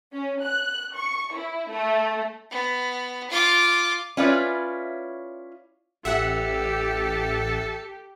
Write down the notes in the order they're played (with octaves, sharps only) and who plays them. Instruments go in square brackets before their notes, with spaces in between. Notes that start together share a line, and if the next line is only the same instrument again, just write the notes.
[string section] C#4
F#6
C#6
E4
A3
[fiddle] B3
F4 D6
[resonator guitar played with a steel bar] C#4 E4 F4 B4 C#5 D5
[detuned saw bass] A1 [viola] G4 [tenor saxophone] A4 [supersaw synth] E5 F#5